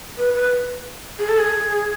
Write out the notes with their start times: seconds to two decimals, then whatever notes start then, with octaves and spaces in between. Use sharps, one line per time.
0.18 B4
0.34 B4
1.19 G#4
1.29 A4
1.38 G#4